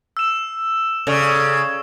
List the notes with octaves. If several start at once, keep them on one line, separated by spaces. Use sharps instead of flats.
E6 E7
C#3 A4 D5 C#6